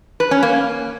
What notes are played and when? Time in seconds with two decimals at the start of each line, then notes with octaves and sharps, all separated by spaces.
0.20 B4
0.31 C#4
0.43 A#3